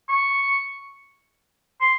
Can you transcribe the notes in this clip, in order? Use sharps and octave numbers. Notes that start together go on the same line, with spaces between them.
C#6
C6